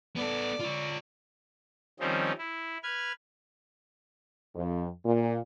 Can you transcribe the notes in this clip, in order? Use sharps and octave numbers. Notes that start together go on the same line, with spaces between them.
B3 A4 D5
F4 C#5
D#3 F3 G3 C4 C#4 D#4
E4
B4 F6 G#6
F2
A#2